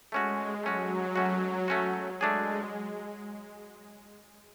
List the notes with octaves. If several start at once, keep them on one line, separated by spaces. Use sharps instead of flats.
G#3 A3 C#4 F#4
F#3 A3 C#4 F#4
A3 C#4 F#4
A3 C#4 F#4
G#3 A3 D4 G#4